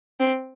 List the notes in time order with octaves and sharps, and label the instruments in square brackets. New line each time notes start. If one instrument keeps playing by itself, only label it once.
[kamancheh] C4